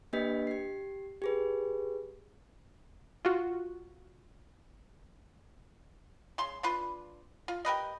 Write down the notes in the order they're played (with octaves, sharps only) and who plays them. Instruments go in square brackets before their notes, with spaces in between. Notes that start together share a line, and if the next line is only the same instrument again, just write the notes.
[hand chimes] A#3 D4 G4 B4 D#5 B6
G4 C7
G4 G#4 B4
[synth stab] F4 F#4
[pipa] C#3 C6
D4 F4 B4
F4
G4 A#4 B4 D#5